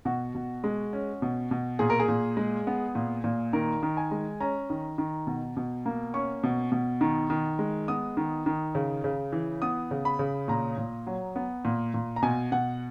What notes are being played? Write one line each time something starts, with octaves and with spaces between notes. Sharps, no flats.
B2 F#4
B2
G#3
C#4
B2
B2
A#2 G#4
A#4
G#4
A#2
G#3
B3
A#2
A#2
D#3 A#4
D#3
G#5
G#3
C#4 A#5
D#3
D#3
B2
B2
A#3
C#4 C#6
B2
B2
D#3
D#3
G#3
B3 D#6
D#3
D#3
C#3
C#3
E3
B3 D#6
C#3
B5
C#3
A#2 A#5
A#2
F#3
B3
A#2
A#2
A#5
B2 G#5
B2 F#5